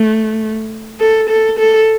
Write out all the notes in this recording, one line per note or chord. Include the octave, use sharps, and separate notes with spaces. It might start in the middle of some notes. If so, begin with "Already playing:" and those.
Already playing: A3
A4
A4
A4